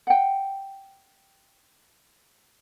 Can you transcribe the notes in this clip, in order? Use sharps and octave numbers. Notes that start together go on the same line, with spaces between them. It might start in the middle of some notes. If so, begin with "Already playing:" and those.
F#5 G5